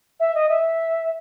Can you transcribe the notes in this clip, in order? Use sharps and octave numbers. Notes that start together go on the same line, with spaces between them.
E5
D#5
E5